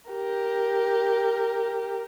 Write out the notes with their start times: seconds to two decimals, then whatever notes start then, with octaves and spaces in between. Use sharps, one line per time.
0.10 G4 A#4